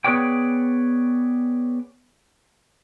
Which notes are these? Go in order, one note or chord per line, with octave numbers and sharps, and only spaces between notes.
B3 G#4 B4 C#5 D5 G5